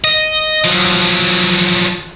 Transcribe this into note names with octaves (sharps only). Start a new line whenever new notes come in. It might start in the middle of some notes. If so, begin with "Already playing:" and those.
D#5
F3 F#3